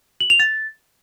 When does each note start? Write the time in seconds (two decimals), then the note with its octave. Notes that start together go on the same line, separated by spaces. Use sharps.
0.20 F#7
0.30 F7
0.40 A6